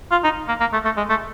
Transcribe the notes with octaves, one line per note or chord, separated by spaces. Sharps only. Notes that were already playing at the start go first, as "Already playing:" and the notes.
F4
D#4
A#3
A#3
A3
A3
G#3
A3